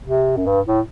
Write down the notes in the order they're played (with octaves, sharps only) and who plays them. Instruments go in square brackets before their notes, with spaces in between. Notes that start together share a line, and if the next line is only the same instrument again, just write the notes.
[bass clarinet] C3
F#2
G2
A2